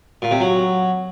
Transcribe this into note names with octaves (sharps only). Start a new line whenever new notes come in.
A#2
C3
F#3